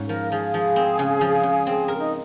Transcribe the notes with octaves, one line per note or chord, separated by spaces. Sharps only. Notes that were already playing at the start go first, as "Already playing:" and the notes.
Already playing: G#2 C#4
F3 A#4
F3 G#4
F3
C4
C#3
F3
C#3
C4
A#4
D#4